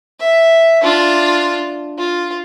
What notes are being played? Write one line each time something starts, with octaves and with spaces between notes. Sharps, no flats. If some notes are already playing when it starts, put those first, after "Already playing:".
E5
D4 F4
F4